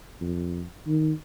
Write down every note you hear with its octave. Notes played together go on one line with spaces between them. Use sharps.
F2
D#3